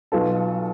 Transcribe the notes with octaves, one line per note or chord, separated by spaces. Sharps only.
B1 B2 B3 F4 A4